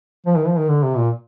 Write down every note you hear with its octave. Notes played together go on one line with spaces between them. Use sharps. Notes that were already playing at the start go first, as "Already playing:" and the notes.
F3
D#3
F3
D#3
D3
C3
A#2